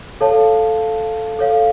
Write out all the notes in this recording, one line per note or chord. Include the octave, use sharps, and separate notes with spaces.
A4 C#5 F5 A5
A4 C#5 F5